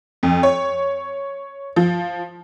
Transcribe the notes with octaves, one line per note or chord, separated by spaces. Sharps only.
F2
C#5
F3